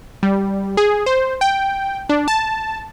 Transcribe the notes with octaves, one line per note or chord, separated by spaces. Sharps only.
G3
G#4
C5
G5
D4
A5